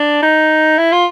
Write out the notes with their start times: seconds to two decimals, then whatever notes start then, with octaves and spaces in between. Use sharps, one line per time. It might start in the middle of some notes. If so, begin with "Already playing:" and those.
Already playing: D4
0.22 D#4
0.78 E4
0.92 F4